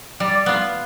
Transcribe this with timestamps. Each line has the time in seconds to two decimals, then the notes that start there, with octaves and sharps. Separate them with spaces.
0.20 G3 D5
0.46 B3 F4